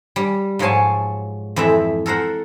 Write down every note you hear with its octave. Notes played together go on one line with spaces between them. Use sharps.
G3
G#2 F3 F#3 C#5 G#5 A5
F2 E3 C4 E4 E5
A4 A#4 C5 F#5